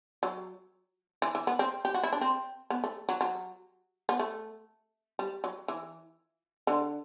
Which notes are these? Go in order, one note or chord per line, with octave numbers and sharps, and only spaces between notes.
F#3
E3
E3
B3
C4
G4
F#4
E4
D4
C4
B3
A3
F#3
F#3
B3
A3
G3
F#3
E3
D3